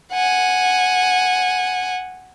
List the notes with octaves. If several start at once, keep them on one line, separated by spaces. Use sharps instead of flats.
F#5 G#5